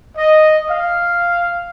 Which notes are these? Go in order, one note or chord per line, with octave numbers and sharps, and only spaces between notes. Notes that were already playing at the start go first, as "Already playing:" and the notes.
D#5
F5